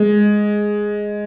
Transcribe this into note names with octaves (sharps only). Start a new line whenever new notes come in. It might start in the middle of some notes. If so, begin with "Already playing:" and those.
Already playing: G#3